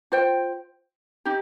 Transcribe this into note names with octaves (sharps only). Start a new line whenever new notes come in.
F4 C5 G5
D#4 G4